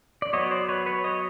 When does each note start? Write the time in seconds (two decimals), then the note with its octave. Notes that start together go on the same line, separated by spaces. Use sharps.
0.22 D5
0.33 F#3 B3 C#5 D#5
0.51 C5 D5
0.69 B4 C#5
0.86 B4 C#5
1.04 C#5 D#5